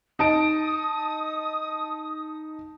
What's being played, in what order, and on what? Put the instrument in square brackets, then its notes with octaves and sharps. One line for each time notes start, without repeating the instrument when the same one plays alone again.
[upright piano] D#4 A5 D7 [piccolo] D#6